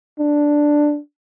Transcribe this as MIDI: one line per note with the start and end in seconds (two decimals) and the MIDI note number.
0.19 0.98 62